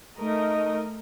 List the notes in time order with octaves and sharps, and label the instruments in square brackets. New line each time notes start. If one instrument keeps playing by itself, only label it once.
[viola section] A3 A#4 D#5 [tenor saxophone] D#4